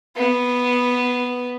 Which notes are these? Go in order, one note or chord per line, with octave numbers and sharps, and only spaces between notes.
B3